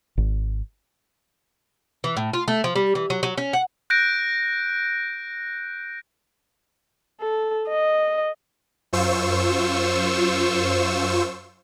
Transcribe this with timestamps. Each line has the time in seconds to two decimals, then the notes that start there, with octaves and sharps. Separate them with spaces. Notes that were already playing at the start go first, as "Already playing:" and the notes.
0.17 G#1
2.04 E3
2.17 A2
2.33 F4
2.48 A3
2.64 F3
2.76 G3
2.95 E3
3.10 F#3
3.23 F#3
3.38 C#4
3.53 F#5
3.90 F#6 G6 A#6 D7
7.21 A4
7.69 D#5
8.93 F#2 F4 C5 C#6 E6